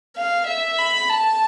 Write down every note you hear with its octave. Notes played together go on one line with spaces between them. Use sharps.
F5
E5
B5
A5